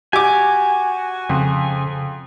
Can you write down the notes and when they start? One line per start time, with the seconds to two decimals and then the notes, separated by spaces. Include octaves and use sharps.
0.13 F#4 G4 G#5 D6
1.29 F2 C#3